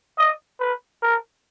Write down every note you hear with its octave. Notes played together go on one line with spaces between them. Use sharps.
D#5
B4
A#4